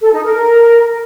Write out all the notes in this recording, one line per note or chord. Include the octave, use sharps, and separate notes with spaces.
A4
D#4
A#4